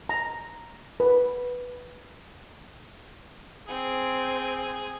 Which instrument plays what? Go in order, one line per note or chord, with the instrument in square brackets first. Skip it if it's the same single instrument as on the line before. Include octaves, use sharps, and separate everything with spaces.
[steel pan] A#5
B4
[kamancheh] C4 [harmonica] G#4